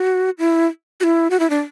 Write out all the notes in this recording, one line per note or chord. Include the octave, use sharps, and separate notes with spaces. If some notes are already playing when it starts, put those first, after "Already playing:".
Already playing: F#4
E4
F#4
E4
F#4
E4
D4